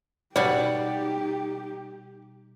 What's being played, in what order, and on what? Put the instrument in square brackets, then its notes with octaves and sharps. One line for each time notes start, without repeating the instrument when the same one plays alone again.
[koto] B2 G3 [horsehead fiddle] D#4 G4 [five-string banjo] D5 F#5